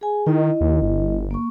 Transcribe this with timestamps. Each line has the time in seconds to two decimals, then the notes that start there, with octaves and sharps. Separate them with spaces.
0.01 G#4 G#5
0.26 D#3 E4 D#5
0.61 D#2
0.82 G1
1.31 A#3 C#6